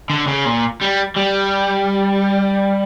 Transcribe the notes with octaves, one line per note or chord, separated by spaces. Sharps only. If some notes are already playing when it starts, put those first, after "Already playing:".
D3
C#3
A#2
G3
G3